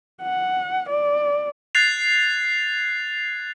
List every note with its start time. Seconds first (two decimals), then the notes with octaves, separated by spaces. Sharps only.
0.22 F#5
0.89 D5
1.75 F#6 G#6 A6 C7 F7